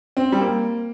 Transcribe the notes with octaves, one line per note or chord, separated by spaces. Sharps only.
C4
G3
A#3